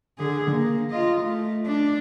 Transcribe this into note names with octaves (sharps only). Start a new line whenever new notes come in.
D3 G#4
A#3
F4 D#5
A3
D4